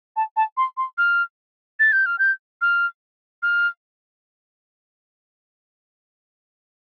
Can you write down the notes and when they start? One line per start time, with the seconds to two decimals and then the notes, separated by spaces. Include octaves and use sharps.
0.16 A5
0.36 A5
0.57 C6
0.77 C6
0.98 F6
1.80 A6
1.92 G6
2.06 F6
2.19 G6
2.61 F6
3.43 F6